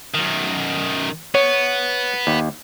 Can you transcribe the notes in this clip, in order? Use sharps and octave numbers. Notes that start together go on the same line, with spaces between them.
F#2 D#3
B3 C#5
D#2